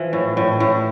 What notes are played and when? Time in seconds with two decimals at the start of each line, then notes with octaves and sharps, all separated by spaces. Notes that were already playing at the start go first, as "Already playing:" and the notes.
Already playing: E3 F3
0.13 A2
0.37 A2
0.60 A2